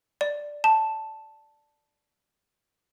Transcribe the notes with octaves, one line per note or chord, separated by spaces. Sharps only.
D5
A5